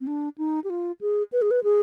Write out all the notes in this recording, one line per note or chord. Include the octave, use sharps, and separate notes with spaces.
C4
D4
D#4
G4
F4
G#4
B4
G#4
B4
G#4